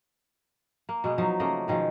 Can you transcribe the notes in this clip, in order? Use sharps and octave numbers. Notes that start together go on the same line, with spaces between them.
A#3
B2 G#3 B3
F3 F#3 D#4
C#3 A3 A#3 D#5
B2 D#3 F3 G#3